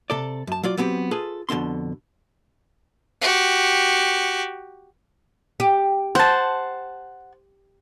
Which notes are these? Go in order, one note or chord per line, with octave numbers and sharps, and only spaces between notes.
C3 A4 D5
F#2 A5
F#3 F4 D5
F#3 B3 C4 G4
F4 G#4 A4 B4
F2 B2 D3 C4 C6
F#4 G4
G4
C5 F#5 A5